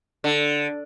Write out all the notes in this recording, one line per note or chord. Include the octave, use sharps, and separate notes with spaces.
D3